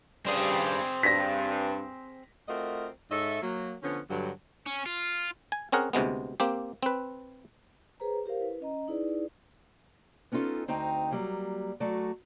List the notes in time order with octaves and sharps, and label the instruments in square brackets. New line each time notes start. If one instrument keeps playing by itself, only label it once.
[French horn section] G2 C#3 G3 [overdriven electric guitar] C4 G#4
[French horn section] G2 [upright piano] A#6 B6
[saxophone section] A3 C4 F4 F#4 A#4 D#5
G#2 A4 C#5 D#5 E5
F#3 A#3
D3 F3 B3 C#4
G2 D3 F#3
[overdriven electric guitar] C#4
F4
[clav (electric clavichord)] G#5
C4 C#4 G#4 A#4 F#5
D2 C3 G#3 B3
A#3 C4 G4
C4 B4
[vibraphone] G#4 B4 C5 A#5
G4 A#4 C5 F5
E4 B4
C#4 D#5 A#5
D#4 E4 G#4 B4 D5
[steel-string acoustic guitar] B3 C#4 D#4 F4 A4
D2 C4 D#4 G5 A#5
F#3 G3 A#3
F#3 A3 F#4 D5